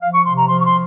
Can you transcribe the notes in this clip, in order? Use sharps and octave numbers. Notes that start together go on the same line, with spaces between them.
F3 F5
C#6
C3 C6
A#5
F3 C6
C#6
C6